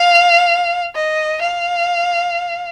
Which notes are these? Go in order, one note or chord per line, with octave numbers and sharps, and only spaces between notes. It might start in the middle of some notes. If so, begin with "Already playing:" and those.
Already playing: F5
D#5
F5